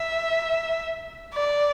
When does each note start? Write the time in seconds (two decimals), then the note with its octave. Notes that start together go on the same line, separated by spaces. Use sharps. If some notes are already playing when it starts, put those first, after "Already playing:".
Already playing: E5
1.34 D5